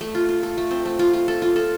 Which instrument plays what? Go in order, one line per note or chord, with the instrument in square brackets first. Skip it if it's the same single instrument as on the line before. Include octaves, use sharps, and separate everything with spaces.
[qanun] A3
F4
F4
A4
A3
C4
A3
F4
F4
A4
F4
A4